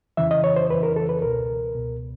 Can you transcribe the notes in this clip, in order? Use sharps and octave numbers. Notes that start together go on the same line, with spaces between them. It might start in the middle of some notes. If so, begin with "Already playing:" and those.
F2 C#3 E3 E5
D#5
C#5
C5
F2 C#3 E3 B4
A#4
A4
B4
C#2 B2 A#4
C#2 B2